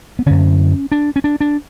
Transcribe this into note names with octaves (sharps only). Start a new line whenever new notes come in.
B3
F#2 D3 C#4
D4
C#4
D4
D4